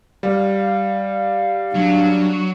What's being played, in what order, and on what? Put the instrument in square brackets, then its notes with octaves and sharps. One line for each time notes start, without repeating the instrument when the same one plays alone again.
[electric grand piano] G3 [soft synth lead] F5
[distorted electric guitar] F#3 [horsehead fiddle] D4